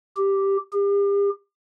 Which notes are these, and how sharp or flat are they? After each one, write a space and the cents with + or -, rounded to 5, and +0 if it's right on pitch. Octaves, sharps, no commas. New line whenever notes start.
G4 +0
G4 +40